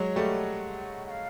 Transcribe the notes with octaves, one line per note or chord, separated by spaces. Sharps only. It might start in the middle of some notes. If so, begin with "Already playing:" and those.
Already playing: F#3 G#3
G3 A3 F#5
F#5
F5